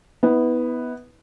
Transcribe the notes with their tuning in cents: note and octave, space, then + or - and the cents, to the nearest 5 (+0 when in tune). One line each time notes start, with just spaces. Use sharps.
B3 +0 E4 -40